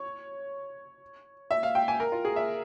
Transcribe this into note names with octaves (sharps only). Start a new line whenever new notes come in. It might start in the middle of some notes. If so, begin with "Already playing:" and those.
Already playing: C#5
E5
F5
G5
G#5
A#4
F4
G#4
E5